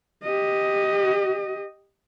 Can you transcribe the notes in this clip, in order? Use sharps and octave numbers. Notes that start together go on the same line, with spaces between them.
G4 D#5